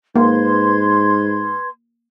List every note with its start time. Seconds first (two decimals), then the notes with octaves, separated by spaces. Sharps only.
0.16 G#2 A#3 B4 C6 G#6